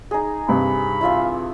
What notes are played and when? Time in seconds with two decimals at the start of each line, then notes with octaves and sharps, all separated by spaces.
0.11 D#4 G#4
0.48 G2 C3 B5
1.01 E4 F4 E5